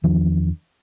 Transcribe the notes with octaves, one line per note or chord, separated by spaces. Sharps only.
E2 D#3 F3 D4